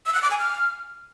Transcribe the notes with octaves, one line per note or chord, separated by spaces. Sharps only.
E6
F#6
D6
G#5
F6